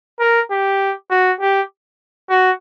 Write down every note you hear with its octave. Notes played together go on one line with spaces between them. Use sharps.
A#4
G4
F#4
G4
F#4